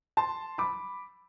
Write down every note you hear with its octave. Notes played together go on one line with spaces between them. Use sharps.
A5 C6
B5 D6